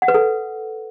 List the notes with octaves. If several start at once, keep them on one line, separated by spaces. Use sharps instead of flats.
F#5
B4
A4